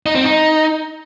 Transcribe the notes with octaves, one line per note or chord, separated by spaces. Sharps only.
D#4
C4
D#4